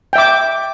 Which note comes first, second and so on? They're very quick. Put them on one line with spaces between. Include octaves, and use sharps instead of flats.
G5 E5 D6